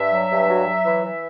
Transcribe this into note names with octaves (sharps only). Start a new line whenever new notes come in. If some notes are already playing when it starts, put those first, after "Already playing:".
Already playing: G2 E5
F#3
G2
F#3
F#3
E3
E3